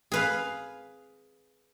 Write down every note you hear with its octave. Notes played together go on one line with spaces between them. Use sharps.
G#4 B4 F5